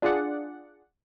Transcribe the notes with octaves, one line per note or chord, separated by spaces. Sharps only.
D4 F4 G#4 D5 F#5